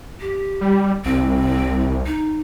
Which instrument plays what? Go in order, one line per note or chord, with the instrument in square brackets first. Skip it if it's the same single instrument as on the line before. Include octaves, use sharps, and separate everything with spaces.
[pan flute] G4
[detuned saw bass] G3
[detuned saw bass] C2 [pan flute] C4
[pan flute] D#4